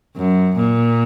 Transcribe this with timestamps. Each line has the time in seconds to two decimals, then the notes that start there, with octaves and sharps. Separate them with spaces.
0.17 F#2
0.57 A#2